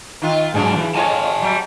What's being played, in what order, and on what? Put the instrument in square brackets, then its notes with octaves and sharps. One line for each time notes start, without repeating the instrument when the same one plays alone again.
[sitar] D#3 F4
[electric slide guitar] G#2 F#3 [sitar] C#3 D4 G#4
[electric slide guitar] E3
[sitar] F2 F4 C#5 [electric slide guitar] D#5 G#5 A5
[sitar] F#3 G3